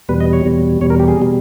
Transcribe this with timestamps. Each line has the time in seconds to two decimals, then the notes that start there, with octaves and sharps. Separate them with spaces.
0.09 E2 B2 G3 B4
0.20 D#5
0.33 C#5
0.45 E2 B2 G3
0.81 E2 B2 G3 C#5
0.90 A#4
1.00 G4
1.08 G#4
1.20 B2 G3